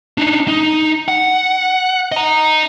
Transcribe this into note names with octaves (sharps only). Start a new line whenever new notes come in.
D4 D#4
D#4
F#5
D#5 A#5